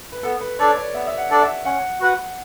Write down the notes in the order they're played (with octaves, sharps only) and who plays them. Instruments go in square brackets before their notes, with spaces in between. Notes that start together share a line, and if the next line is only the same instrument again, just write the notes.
[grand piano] B4
[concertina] B3 [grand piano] A4
[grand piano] B4
[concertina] D4 A4 D5 [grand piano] C#5
[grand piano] D5
[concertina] B3 [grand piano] E5
[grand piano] E5
F#5
[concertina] D4 A4 D5
[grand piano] E5
[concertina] C#4 [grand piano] F#5
[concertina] F#4 B4 F#5